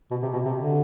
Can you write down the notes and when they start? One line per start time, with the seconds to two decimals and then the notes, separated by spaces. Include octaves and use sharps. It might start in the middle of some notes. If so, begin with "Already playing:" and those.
0.11 B2
0.22 C3
0.33 B2
0.45 C3
0.57 D3